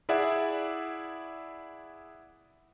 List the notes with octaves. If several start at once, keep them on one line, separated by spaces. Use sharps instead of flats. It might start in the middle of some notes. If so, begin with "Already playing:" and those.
E4 G#4 D5 E5 F#5